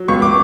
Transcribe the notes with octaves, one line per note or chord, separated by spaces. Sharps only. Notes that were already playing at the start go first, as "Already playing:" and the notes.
Already playing: F#3
C#2 C#6
D6